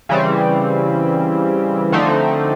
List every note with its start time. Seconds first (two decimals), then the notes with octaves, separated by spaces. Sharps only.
0.09 C#3 E3 G3 C4
1.92 D3 F3 A3 C4 D#4